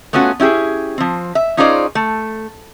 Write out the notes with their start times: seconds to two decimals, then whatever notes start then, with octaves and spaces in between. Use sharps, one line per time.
0.13 A3 B3 C#4 F4 F#4
0.40 C#4 E4 G4 G#4
0.98 F3 C4
1.35 E5
1.57 C#4 D#4 F4 G#4 C5 D5
1.95 A3